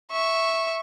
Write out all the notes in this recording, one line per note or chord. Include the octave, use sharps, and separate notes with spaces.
E5 C#6